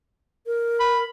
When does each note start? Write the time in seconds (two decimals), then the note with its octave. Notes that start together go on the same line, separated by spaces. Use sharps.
0.46 A#4
0.80 B5